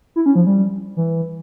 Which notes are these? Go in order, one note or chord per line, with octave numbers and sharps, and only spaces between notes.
E4
C#4
F3
G3
E3